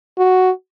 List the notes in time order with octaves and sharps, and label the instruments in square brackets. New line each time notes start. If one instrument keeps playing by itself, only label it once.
[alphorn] F#4